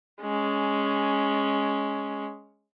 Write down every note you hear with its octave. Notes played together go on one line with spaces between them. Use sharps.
G#3 C#4